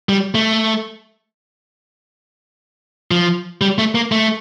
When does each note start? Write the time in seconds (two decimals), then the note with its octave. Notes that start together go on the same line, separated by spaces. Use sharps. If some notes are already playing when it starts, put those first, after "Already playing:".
0.09 G3
0.35 A3
3.11 F3
3.61 G3
3.78 A3
3.95 A#3
4.12 A3